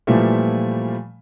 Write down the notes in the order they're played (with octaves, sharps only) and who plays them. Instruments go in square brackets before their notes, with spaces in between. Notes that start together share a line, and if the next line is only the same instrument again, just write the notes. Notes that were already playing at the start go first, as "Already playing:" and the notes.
[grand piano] A#2 E3 F3 G3 A3